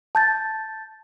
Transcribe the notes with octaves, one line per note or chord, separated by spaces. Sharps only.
A5 G6 A6